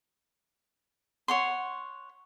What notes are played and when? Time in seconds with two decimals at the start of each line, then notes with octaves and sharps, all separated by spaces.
1.28 C#5 F#5 C6